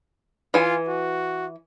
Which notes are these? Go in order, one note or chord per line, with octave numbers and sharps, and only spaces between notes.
E3 F4 G#5
F#4